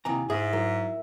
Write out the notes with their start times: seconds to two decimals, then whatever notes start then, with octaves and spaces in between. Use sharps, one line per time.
0.05 D#2 C3 E4 G#5 A#5
0.30 G#2 G#4 E5
0.53 F#3 E4 A#4